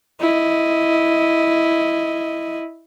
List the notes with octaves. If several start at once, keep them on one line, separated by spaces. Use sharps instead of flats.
E4 D#5